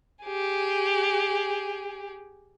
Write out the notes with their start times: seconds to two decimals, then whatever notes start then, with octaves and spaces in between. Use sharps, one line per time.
0.24 G4 G#4